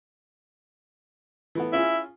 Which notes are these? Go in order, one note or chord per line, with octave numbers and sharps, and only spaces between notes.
E3 A3 B3
C#4 E4 F4 G#4